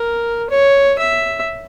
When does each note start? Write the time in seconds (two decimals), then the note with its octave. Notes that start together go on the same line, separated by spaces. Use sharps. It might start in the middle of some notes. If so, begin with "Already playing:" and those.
Already playing: A#4
0.50 C#5
0.99 E5